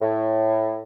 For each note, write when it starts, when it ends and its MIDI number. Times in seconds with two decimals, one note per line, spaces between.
0.01 0.81 45